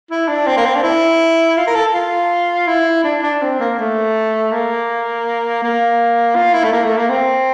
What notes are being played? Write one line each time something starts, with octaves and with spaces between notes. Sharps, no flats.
E4
D4
C4
A#3
C4
D4
E4
F4
A#4
A4
F4
E4
D4
D4
C4
A#3
A3
A#3
A#3
F4
E4
A3
A#3
A3
A#3
C4